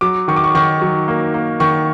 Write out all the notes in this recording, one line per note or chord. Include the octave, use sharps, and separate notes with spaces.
F#3 D6
D#3 C#6
D6
C#6
D#3 C#6
F#3
A#3
A#3
D#3 C#6